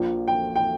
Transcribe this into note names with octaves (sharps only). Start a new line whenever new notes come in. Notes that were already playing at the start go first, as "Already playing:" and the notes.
Already playing: A#1 A#2 F3 A#3
G5
G5